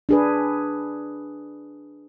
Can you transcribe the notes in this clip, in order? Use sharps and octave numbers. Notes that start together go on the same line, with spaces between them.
D4 G#4 B4